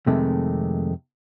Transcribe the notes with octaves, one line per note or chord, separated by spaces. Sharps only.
F2 C3 D#3 G#3 A3